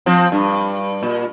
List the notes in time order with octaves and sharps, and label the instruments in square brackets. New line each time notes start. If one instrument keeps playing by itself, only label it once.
[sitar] F3 C4
G2
A#2